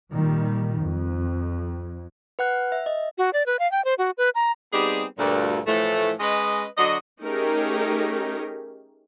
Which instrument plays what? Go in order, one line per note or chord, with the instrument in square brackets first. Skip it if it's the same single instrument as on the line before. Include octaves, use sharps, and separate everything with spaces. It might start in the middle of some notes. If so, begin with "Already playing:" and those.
[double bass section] A#2 D#3 G3
F2
[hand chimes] B4 F#5 F#6
E5
D#5
[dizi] F#4
D5
B4
F5
G5
C5
F#4
B4
A#5
[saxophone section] G3 B3 C4 D#4 G4 G#4
D2 G2 A#2
A2 E3 F3 A3
G#3 C#4 B4 D#5
D3 F#3 F#4 D#5
[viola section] A3 C#4 D#4 G4 G#4 A#4